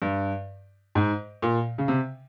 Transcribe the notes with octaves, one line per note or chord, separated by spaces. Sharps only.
G2
G#2
A#2
C#3
C3